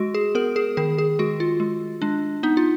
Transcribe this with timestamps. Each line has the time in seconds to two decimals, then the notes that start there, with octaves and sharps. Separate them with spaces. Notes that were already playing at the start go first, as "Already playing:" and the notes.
Already playing: G#3 F#4
0.15 G#4
0.35 B3 A#4
0.56 G#4
0.77 D#3 G#4
0.98 G#4
1.19 G#3 F#4
1.40 F4
1.60 G#3
2.02 G#3 D4
2.43 B3 D#4
2.57 F4